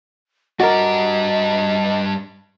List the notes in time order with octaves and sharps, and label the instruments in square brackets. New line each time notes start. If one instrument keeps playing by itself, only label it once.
[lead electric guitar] G2 D5 [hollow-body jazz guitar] F#4 A#4 [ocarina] D#5